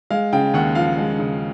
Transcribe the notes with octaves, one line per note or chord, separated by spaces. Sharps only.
G#3 F5
C#3 G5
D#2 F#5
F3 F5
G#3
C#3